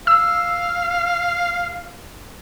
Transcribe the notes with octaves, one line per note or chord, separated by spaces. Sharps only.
F5 E6